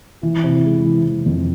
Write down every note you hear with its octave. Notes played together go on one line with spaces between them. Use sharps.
E3 E4
C3
G#3
E3
E3
F2